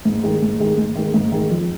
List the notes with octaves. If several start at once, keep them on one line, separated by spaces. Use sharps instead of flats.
G#2
D#3 G#3
G#2
D#3 G#3
G#2
D#3 G#3
G#2
D#3 G#3
F2